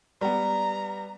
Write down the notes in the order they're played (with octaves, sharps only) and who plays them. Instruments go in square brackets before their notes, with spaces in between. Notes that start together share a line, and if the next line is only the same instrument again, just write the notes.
[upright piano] G3 B3 [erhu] A#5